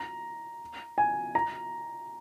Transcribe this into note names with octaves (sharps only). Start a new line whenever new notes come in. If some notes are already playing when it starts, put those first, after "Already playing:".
Already playing: A#5
G#5
A#5